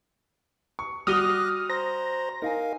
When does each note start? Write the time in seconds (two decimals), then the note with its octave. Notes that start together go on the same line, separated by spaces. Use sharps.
0.79 C#6
1.07 G3 F#4 D6 D#6 F6 F#6 A#6 G7
1.70 C5 A#5 C6 A#6
2.42 D#4 A#4 F5 G#5